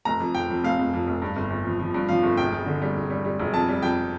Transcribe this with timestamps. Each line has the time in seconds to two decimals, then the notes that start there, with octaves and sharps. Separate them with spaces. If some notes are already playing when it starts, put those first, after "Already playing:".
0.05 F1 A#5
0.20 F2
0.35 F2 G5
0.50 F2
0.64 F1 F5
0.79 F1
0.93 F2
1.07 F1
1.22 G2
1.36 G1
1.50 G1
1.65 F3
1.79 F3
1.94 G2
2.08 F3 F5
2.23 G1
2.37 E1 G5
2.52 E1
2.66 D3
2.82 G3
2.96 E1
3.10 G3
3.25 G3
3.39 E1
3.53 F2 A5
3.68 G3
3.82 F2 G5